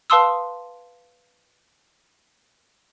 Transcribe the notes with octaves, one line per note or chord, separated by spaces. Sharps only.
B4 F5 A5 C6 D#6 E6